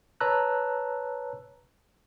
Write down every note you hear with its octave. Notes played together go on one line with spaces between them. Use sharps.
B4 C#5 A5 A#5 E6 F#6